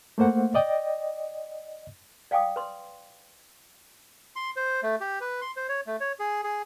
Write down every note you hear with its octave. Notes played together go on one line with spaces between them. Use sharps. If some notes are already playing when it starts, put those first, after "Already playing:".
A3 A#3 C5 F#5
D5 D#5 G5
D5 F5 G5 G#5 D6 D#6
B4 C6
C6
C5
A3
G4
B4
C6
C5
C#5
A3
C#5
G#4
G#4